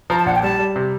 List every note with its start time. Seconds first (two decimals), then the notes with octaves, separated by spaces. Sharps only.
0.09 F3 A#5
0.18 A5
0.26 A#1 F#5
0.34 G5
0.42 G3 A5
0.59 G3
0.76 C3